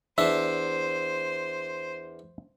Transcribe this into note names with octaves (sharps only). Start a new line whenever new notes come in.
E2 D4 C5 E5 A5